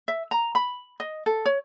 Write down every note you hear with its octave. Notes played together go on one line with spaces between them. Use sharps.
E5
A#5
B5
D#5
A4
C#5